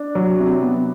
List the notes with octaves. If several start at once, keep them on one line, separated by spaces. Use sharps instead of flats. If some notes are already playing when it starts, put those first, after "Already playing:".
Already playing: D4
F#3
C3
B3